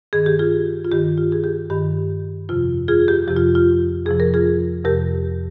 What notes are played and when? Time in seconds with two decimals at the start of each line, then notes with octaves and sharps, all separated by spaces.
0.13 G2 D#3 G#4
0.26 G4
0.39 F4 G#4
0.84 F4
0.91 G2 D#3 G4
1.18 F4
1.32 G#4
1.44 G4
1.70 G2 D#3 G4
2.49 F2 C3 F3 F4
2.88 F4 G#4
3.08 G4
3.27 F2 C3 F3 G4
3.37 F4
3.55 F4
4.06 F2 C3 F3 G#4
4.20 A#4
4.34 F4 G#4
4.85 F2 C3 F3 G4 A#4